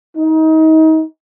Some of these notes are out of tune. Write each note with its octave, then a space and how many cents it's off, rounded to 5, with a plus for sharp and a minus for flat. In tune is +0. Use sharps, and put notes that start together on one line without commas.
D#4 +30